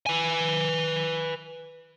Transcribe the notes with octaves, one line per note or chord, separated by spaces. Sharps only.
B4 G#5